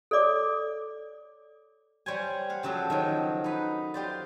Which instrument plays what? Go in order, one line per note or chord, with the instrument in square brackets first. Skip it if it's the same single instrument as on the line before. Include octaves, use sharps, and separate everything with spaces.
[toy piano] A4 C#5 D5 D6
[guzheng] G3 C5 C#5 G5 G#5
F5 F#5
C#3 F3 F#3 F#4 G4 A4
D#3 F3 F#3
D#4 B4
F4 G4 C5 D5